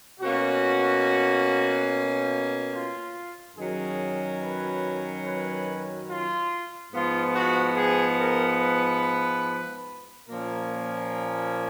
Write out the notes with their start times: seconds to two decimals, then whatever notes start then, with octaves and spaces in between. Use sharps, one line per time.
0.20 B2 A#3 C#4 F#4
2.72 F4
3.56 F#2 D#3 F#3 C#4 G#4
4.40 B4
5.24 B4
6.08 F4
6.92 G#2 F3 B3 F4
7.34 F#4
7.76 G#4
8.17 A#4
8.60 B4
10.28 A#2 F3 A#3 C#4 A#4
10.70 A#4